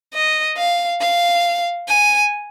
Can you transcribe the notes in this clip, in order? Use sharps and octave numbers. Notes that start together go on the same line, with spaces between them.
D#5
F5
F5
G#5